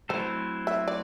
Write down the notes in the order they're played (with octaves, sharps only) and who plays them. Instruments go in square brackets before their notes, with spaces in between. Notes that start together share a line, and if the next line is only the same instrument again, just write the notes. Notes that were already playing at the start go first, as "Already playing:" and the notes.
[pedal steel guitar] F#3 A3 C4 E4 A4 [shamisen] C5
[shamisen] E5
D5